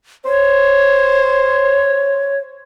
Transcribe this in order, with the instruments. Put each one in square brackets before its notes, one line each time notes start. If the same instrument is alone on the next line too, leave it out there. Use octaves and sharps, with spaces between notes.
[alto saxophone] C5 [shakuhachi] C#5